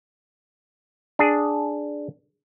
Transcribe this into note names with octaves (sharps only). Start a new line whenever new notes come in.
D4 G#4